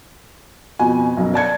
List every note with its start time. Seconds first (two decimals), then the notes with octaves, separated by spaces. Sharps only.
0.79 F2 B2 G#5
1.17 B1 F#2
1.34 D5 A5 G#6 C#7